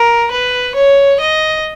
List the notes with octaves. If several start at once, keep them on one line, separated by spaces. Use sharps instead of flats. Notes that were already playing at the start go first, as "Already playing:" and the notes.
Already playing: A#4
B4
C#5
D#5